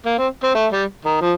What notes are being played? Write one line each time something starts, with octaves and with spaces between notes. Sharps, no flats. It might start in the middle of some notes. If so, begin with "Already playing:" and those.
A#3
C4
C4
A3
G3
D#3
F3